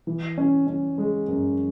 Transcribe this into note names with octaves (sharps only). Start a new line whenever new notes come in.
E3
C#4
C#4
G#3
F#2